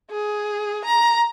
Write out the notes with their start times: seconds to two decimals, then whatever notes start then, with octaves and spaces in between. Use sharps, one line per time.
0.11 G#4
0.85 A#5